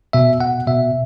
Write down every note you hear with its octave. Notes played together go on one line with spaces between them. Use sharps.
B2 E5
B2 F#5
B2 E5